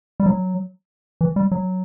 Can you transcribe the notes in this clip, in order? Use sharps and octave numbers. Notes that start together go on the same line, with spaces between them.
G3
F#3
E3
G3
F#3